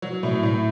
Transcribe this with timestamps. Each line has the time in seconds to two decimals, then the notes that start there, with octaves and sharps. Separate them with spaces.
0.02 F#3
0.23 A2
0.43 A2